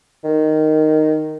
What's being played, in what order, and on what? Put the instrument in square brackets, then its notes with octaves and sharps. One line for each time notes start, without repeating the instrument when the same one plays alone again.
[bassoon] D#3